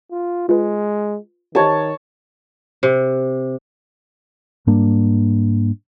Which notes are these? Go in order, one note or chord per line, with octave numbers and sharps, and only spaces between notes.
F4
G#3 F4 B4
D#3 G4 C5 C#5 D#5 A5
C3
G#2 G3 A#3 D4